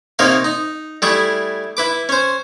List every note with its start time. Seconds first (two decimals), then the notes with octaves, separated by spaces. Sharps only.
0.19 C3 A#3 D#4 C#5 F5
0.44 D#4
1.02 G3 A3 E4 G#4
1.77 E4 B4 D6
2.09 C#4 C5